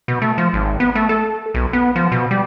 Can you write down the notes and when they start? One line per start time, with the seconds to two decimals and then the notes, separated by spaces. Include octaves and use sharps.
0.08 B2
0.22 A3
0.38 F3
0.53 G#1
0.80 B3
0.95 A3
1.09 A4
1.54 B1
1.73 B3
1.96 F3
2.12 B2
2.31 G3